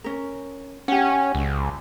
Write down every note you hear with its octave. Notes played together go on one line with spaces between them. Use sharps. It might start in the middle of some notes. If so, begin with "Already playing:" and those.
C#4 A#4
C#4 G4 F#5
C#2